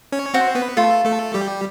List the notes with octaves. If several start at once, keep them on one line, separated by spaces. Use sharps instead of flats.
C#4 C#5
C4 F#4 C5
B3 B4
A3 F4 A4
A3 A4
G3 G4